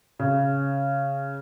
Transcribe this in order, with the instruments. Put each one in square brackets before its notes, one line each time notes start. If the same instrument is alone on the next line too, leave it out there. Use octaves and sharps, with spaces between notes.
[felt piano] C#3